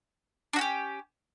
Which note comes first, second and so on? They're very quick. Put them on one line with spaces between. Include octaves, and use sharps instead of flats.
D4 F#4 C#4 G4